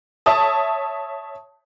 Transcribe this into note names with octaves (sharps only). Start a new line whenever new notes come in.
C#5 E5 A5 D#6